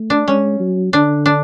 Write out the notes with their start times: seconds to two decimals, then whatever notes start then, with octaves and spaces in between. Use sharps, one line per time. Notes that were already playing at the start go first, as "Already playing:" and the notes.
Already playing: A3
0.10 D4
0.27 G#3 C#4
0.60 F#3
0.93 D3 D4
1.26 D4